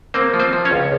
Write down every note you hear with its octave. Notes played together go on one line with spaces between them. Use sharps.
A#3 C4 C5
F3
C4 C5
F3
C#4 C#5
C#2